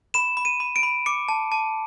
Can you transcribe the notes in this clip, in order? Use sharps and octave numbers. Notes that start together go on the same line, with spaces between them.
B5 E7
B5
D#7
B5
D7
B5
D6 C#7
A5
A5